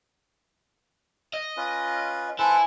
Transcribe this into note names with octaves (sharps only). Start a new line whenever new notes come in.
D#5
C#4 F4 B4
E4 A4 B4 C5 G#5